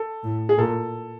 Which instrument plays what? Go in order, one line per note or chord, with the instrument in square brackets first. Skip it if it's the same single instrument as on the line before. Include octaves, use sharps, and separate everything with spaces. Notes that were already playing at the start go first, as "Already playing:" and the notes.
Already playing: [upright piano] A4
[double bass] A2
[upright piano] G#4
[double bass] A#2 [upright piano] A4